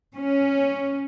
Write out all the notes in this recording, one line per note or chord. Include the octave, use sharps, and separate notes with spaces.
C#4